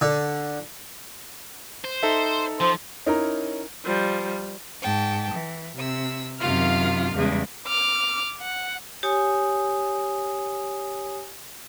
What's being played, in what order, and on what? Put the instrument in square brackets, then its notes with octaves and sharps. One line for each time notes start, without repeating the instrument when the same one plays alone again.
[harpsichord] D3
[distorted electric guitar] C5
[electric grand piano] D#4 A4 E5
[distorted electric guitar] F3 [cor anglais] C5
[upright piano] C#4 D#4 E4 A#4 A#5
[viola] F3 G3
[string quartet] G#2 G5 A5
E3
C3 E6
F#2 C3 D#3 F4 F5 F6
E2 C#3 G3 G#3
[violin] D6 F6
F#5
[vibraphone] G4 C#5 G#5 D#6